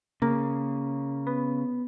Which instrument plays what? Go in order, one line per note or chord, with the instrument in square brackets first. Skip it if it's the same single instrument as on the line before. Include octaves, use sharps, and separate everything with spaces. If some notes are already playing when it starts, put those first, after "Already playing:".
[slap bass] C#3 [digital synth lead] A#3
[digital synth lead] B3